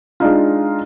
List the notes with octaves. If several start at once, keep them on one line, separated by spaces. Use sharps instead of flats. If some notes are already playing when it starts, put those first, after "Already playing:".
G#3 D4 D#4 F4